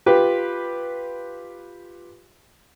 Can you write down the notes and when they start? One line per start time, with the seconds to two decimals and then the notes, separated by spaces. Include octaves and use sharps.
0.06 F4 G4 B4